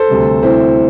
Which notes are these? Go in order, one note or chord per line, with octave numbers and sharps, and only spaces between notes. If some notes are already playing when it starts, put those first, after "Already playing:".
Already playing: A4 C5
D2 C3 G3
C4 E4